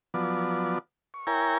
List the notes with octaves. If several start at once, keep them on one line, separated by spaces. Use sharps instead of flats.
F3 F#3 B3 D5
C#6
E4 A#4 C#5 G5 G#5 A#5